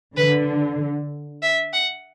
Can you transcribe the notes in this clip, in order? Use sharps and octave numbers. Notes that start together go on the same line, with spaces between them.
D3 B4
E5
F#5